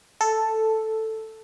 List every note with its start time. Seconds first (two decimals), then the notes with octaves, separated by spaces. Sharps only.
0.21 A4